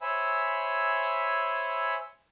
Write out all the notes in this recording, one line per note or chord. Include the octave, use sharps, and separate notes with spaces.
C5 C#5 E5 G#5 B5 E6